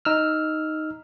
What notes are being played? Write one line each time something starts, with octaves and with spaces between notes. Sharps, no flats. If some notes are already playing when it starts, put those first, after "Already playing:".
D#4 E6 F6